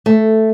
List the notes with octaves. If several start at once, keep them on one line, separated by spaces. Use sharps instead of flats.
A3